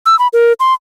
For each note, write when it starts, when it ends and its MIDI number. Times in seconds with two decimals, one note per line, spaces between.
0.06 0.18 88
0.19 0.28 83
0.33 0.53 70
0.60 0.74 84